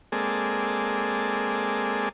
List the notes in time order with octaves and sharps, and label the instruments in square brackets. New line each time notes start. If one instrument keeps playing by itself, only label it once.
[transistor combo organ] G#3 A#3 C4 G#4 A4 D5